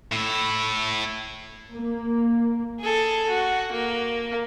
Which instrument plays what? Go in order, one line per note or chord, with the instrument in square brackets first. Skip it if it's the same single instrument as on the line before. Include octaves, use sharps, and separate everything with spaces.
[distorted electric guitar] A2 E4
[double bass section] A#3
[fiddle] G#4 A4
F#4
A#3